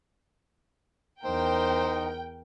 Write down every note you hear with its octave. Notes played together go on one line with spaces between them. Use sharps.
E2 D#4 A#4 C5 G5